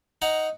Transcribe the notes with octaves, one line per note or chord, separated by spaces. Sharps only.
D#4 F#5 A#5